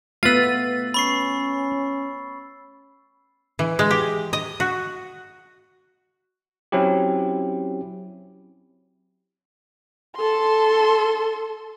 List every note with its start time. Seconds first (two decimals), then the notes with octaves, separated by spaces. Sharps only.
0.23 A3 B3 F4 B4 E6 A6
0.94 C#4 B5 C#6 C7
3.59 E3
3.79 G#3
3.91 G4
4.33 D#5
4.60 F#4
6.72 F#3 C4 C#4 E4 G4
10.16 A4 C6